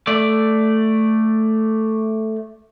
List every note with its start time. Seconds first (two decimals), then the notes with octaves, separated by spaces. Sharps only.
0.07 A3 D5